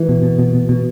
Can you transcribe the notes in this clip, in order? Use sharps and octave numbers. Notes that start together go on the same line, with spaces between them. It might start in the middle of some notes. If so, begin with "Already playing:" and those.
Already playing: E3
B2
B2
B2
B2
B2